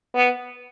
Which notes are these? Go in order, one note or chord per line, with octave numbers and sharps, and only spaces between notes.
B3